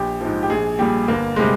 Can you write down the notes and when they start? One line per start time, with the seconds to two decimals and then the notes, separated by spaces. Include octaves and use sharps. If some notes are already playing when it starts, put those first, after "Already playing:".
Already playing: A#1 G4
0.21 G#2 F3
0.43 G4
0.50 A#1 G#4
0.79 A#2 G3 G4
1.08 G1 A#3
1.36 C3 G3 G#3